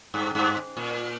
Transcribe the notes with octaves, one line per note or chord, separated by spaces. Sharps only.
G2
G2
A#2